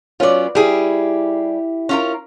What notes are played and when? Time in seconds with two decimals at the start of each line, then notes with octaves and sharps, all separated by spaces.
0.20 F#3 B3 C#4 F4 D5
0.55 G3 E4 G4 G#4
1.89 C#4 F4 A#4